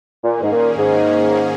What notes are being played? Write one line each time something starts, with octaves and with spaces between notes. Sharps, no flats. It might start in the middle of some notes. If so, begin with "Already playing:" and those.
A#2 D#3 A#3 C#4 G#4
G#2
A#2
G#2